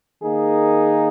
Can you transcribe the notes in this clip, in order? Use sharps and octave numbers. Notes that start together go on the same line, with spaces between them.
D#3 A#3 D#4 G#4